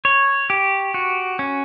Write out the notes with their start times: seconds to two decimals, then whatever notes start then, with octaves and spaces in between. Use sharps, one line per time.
0.05 C#5
0.50 G4
0.94 F#4
1.39 C#4